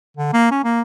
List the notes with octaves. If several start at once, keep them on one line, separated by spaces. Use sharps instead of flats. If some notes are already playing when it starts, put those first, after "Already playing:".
D3
A#3
C#4
A#3